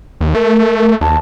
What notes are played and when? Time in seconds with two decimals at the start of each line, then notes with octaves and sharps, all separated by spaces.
0.21 D#2
0.35 A3 A#4
0.79 A#4
1.01 D#2 A5